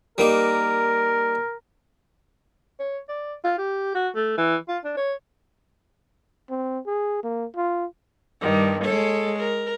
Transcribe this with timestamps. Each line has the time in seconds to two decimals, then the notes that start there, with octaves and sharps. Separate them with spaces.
0.18 G3 A#3 D#4 A#4
2.80 C#5
3.09 D5
3.44 F4
3.58 G4
3.94 F#4
4.15 A3
4.37 E3
4.68 F4
4.84 D4
4.97 C#5
6.50 C4
6.86 G#4
7.24 A#3
7.56 F4
8.40 G2 D#3 G3
8.85 G#3 A4 C#5
9.39 A#4